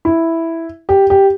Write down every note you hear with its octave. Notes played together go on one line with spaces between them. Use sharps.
E4
G4
G4